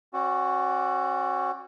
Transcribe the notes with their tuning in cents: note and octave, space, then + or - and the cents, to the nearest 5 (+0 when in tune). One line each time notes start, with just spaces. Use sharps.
C#4 -45 F#4 +0 D5 +0